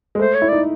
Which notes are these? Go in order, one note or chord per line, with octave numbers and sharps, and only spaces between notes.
G#3
A3 C5
C#5
E4
D#4 D5